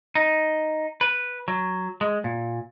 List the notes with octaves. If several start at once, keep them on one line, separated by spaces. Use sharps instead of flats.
D#4
B4
F#3
G#3
A#2